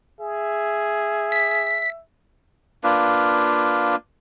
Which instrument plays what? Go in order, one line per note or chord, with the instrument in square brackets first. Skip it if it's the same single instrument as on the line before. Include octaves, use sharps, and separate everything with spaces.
[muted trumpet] G#4 [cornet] E5
[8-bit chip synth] B6
[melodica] A#3 D4 F4 B4